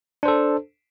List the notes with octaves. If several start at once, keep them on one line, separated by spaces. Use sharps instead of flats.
D4 A4 C5